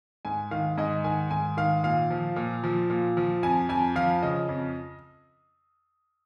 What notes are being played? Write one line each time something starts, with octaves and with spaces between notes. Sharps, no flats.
G#2 G#5
D#3 F5
G#2 D#5
D#3 G#5
G#2 G#5
D#3 F5
A#2 F5
F3
A#2
F3
A#2
F3
F2 G#5
F2 G#5
F3 F5
C#3 D#5
F2